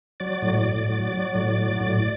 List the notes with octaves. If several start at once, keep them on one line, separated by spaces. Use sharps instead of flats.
F#3 D5
A2
D5
A2
F#3
F#3
A2
F#3
A2